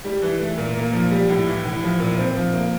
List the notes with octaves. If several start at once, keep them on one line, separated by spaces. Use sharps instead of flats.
G3
E3
A3
A#2
A#3
F3
G3
A2
E3
A2
F3
A#2
C4
F3
A#3